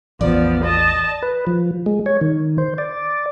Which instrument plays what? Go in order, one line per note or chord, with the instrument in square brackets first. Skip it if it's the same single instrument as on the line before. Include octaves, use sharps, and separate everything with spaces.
[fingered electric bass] A1 E2 [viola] F3 B3 [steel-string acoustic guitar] D5
[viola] D#5 A5
[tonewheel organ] B4
F3
G#3
C#5
D#3
C5
D5